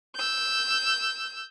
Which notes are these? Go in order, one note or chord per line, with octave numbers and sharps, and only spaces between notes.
E6 G6